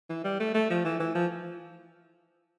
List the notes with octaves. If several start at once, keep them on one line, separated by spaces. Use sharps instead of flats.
E3
G3
A3
A3
F3
E3
E3
F3